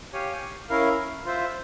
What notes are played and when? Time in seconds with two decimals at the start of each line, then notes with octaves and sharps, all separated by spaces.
0.13 G4 C#5 F5 G#5
0.69 C#4 E4 A#4 F5
1.25 F4 C5 E5